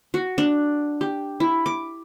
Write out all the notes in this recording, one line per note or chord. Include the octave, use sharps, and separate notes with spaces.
F#4
D4
G4
E4
D6